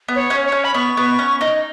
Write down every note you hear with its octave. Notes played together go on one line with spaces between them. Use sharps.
B3
C#5
C#4
C#5
C#4
B5
B3 C#6
B3
C#4
D#4